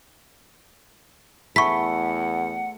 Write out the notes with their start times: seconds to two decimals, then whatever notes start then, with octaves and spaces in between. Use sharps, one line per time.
1.56 E2 A3 E4 F#5 C#6 B6